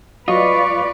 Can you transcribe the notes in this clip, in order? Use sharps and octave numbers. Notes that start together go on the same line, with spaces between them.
F#3 F4 B4 D5 D#5 C#6